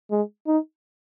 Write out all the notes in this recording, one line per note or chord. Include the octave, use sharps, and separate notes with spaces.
G#3
D#4